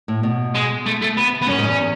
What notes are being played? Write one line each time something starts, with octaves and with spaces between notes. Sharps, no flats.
A2
B2
G#3
A3
A3
B3
B3
F#2 C#4
G#2
E2